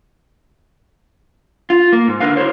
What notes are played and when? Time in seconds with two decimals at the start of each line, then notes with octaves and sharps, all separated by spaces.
1.70 F4
1.93 A#3
2.08 G#2
2.20 D3 A#4 B4 F5
2.36 E4 F#4 G#4 A#4 C5 C#5